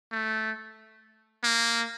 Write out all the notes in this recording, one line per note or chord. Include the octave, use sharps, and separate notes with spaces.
A3
A#3